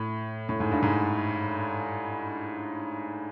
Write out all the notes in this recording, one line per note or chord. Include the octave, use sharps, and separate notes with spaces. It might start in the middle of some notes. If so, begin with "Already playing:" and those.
Already playing: A2
A2
G#2
G2
G#2